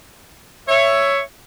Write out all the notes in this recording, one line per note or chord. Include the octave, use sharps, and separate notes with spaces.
C#5 E5